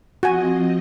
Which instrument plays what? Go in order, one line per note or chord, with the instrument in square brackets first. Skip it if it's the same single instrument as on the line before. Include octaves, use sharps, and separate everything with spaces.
[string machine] F3 C4 D#5 [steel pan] F#4 G#5